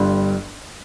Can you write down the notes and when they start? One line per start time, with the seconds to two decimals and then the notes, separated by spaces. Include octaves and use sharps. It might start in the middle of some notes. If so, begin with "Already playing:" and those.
Already playing: G1 G2 G3